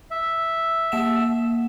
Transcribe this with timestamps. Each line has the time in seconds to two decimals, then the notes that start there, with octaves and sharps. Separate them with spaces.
0.11 E5
0.92 A#3 F#5 E7